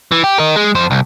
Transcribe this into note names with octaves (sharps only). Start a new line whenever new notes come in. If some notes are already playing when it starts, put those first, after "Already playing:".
E3
G4
A#4 D#5
G#3
F2 C5
C2